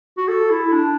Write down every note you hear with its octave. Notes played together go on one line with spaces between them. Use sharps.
F#4
A4
E4
D4